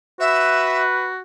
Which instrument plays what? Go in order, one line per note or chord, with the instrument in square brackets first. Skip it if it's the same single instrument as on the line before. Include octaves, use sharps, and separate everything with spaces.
[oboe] F#4 [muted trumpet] B4 [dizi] E5